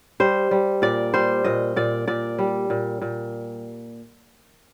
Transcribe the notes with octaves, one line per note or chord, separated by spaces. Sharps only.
G3 C5
G3
A#2 D5
G3 C5
A#2 D#5
A#2 D5
A#2 D5
G3
A#2
A#2